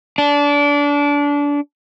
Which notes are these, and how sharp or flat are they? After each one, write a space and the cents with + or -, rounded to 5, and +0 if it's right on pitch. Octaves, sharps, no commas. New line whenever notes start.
D4 -25